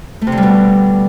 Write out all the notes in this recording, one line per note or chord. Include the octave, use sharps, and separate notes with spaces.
A3
C3
D3
G3
B2